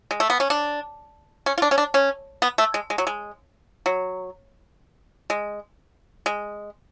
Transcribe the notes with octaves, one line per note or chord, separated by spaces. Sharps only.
G#3
A3
B3
C#4
D4
C#4
F4
D4
C#4
D4
C#4
B3
A3
G#3
G#3
F#3
G#3
F#3
G#3
G#3